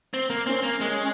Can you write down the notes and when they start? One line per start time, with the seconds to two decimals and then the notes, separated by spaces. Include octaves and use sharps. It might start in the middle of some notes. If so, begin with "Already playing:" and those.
0.14 C4
0.30 A#3
0.46 C4 C#4
0.63 A#3
0.80 G#3 C#4